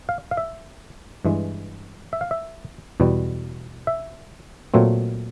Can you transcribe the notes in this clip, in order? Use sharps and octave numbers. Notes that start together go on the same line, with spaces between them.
F5
F5
E5
G2 E3 G#3
E5
F5
E5
E2 B2 G3
E5
A#2 F#3 A3 C4